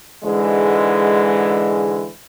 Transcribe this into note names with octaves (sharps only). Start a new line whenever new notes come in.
G#2 D3 E3 G#3